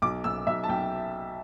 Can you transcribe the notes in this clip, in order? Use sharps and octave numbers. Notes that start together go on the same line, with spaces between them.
B1 D6
B1 E6
B1 E5
A5
B1 G5